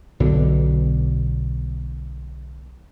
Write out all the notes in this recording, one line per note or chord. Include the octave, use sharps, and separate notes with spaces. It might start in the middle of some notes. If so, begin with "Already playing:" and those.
B1 B2 D3